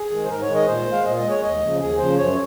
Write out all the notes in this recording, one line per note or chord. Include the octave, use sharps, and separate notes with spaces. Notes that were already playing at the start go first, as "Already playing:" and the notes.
Already playing: G#4
D#3 G#3
C5
G#2 A#4
C#5
D#3 G#3
D#5
A#2 C5
G#3
F5
A#2 D#5
D#5
G#3
C#5
D#2 D#5
C#3 F3
D#2 G#4
C#3 F3 C5
F#2 C#5